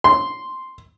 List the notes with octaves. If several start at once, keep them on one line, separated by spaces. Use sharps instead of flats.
C6